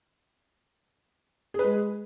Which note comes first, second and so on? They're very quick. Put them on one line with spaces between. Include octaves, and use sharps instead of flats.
G#4 B4 G#3